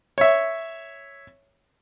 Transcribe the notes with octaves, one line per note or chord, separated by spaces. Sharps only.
C#5 E5